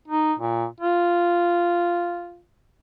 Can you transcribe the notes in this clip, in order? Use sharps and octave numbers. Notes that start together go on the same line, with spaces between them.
D#4
A#2
F4